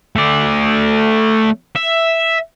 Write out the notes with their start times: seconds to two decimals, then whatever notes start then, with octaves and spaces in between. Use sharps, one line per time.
0.16 A3 D5
1.76 E5